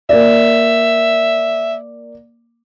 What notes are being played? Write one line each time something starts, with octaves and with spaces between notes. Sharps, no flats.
A#3 D5 E5